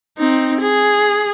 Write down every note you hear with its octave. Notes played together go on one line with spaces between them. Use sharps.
C4 D#4
G#4